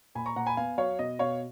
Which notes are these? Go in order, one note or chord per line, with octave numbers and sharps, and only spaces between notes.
A#2 G#5 B5
A#5 C#6
A#2 F#5 A#5
G#5 B5
B3 F5 G#5
F#3 C#5 F5
B2 D#5
B2 C#5 F5